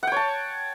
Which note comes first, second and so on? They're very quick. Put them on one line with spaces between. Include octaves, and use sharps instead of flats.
F#5 G5 C#5 A5